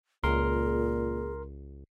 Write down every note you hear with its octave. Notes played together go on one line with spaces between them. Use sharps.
C#2 A#2 G#4 A#4 C6